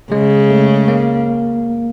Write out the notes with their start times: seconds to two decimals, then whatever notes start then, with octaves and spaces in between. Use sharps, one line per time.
0.12 C#3 G#3
0.50 A3
0.88 A#3